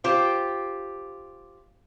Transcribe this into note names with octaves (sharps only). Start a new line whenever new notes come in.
F4 G4 C5